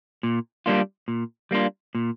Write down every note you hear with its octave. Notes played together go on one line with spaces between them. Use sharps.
A#2
G3 A#3 D4 F4
A#2
G3 A#3 D4 F4
A#2